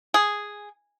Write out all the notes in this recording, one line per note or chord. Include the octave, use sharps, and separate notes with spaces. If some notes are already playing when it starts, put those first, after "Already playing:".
G#4